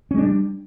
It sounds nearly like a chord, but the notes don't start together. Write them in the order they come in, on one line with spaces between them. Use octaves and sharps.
C#4 G#3 D4 G3